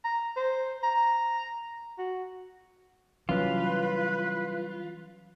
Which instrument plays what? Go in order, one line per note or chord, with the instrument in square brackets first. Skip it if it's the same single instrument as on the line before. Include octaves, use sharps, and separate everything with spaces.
[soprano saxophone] A#5
C5
A#5
F#4
[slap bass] E3 G3 [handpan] F#3 C#4 [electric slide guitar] F4 [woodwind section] B4